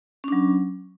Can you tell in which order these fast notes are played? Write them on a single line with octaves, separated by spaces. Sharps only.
C#4 D4 F#3